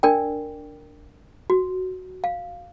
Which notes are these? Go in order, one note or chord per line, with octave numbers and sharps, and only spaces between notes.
D4 A#4 D5 G5
F#4
F5